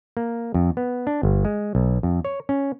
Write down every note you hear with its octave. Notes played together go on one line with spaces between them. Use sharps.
A#3
F2
B3
D4
G1
G#3
B1
F2
C#5
C#4